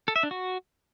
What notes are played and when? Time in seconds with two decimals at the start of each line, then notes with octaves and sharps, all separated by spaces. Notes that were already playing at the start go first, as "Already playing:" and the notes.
0.08 A4
0.16 E5
0.23 D4
0.31 F#4